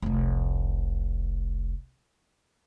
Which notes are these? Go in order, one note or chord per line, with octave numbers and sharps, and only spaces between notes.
F1 C2